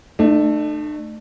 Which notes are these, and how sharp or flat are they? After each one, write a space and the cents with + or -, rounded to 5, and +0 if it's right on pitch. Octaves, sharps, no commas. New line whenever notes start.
A3 +0 D4 +45